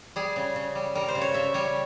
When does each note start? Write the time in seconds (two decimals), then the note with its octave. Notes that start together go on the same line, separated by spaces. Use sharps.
0.16 G3 G#4
0.36 C#3
0.56 C#3
0.75 G3
0.95 G3 A#4
1.08 C5
1.15 C#3
1.21 C#5
1.34 C#3 E5
1.54 G3 C#5